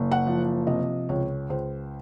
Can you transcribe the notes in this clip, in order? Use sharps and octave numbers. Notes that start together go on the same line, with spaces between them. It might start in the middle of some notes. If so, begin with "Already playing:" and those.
Already playing: F#1
F#5
F3
C3 D#5
C#2 C#5
C#2 C5